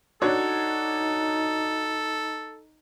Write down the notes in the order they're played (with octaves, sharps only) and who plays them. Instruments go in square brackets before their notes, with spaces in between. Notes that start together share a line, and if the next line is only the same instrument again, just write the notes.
[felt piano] D4 F#4 C#5 [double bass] D#4 [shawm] A4